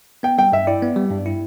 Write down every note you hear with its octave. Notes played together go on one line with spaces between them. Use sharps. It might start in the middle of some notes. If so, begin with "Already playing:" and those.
B3 G5
G3 G5
G2 E5
E4 D5
B3
G3
G2
E4